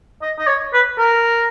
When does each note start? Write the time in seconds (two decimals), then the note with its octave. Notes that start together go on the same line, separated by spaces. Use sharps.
0.22 D#5
0.39 D#5
0.47 C#5
0.73 B4
0.98 A#4